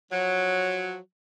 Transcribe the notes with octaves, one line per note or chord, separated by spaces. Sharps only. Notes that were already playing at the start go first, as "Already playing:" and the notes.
F3 F#3